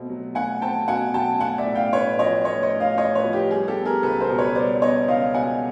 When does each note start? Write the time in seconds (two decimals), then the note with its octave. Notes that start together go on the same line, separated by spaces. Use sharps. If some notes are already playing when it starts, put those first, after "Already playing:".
Already playing: B2 A3 C4
0.09 F#3
0.35 A3 F#5 G#5
0.62 C4 G5 A5
0.88 B2 F#5 G#5
1.14 F#3 G5 A5
1.40 A3 F#5 G#5
1.58 D5 E5
1.67 A2
1.75 F5 G5
1.93 A2 B4 C#5
2.19 F3 C#5 D#5
2.45 A3 C#5 D#5
2.63 C#5 D#5
2.72 A2
2.80 D#5 F5
2.98 A2 C#5 D#5
3.15 B4 C#5
3.24 F3
3.33 G4
3.50 G3 G#4
3.68 G4 A4
3.77 B3
3.85 G#4 A#4
4.03 C#2 A4 B4
4.21 A#4 C5
4.30 B2
4.38 B4 C#5
4.55 G3 C5 D5
4.82 B3 C#5 D#5
5.08 C#2 D#5 F5
5.34 B2 F#5 G#5